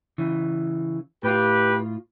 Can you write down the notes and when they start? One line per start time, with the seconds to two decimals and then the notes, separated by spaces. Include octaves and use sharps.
0.18 C#3 E3
1.23 A2 F4 G4 B4